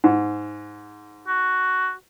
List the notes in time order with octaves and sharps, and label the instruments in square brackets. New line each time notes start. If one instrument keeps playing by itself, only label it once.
[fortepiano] G#2
[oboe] F#4